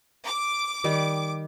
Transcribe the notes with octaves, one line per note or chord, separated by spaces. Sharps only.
D6
D#3 G3